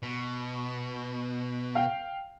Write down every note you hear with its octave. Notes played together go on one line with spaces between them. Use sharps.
B2
F5 G5